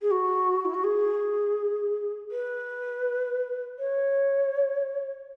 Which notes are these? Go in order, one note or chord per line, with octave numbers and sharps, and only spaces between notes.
G#4
F#4
E4
F#4
G#4
B4
C#5